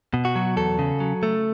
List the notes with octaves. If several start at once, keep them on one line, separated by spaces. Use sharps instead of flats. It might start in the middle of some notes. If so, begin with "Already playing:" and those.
B2
F#4
F#3
E2 A4
C#3
F#3
A3